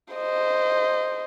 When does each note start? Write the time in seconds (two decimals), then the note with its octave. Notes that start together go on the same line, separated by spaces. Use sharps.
0.14 C5 D#5